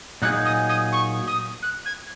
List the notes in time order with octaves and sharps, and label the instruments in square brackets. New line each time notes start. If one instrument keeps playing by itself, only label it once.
[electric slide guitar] A#2 F#3 D#4 G#4 [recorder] F#6
[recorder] D#6
D#6
C#6
D#6
F#6
G#6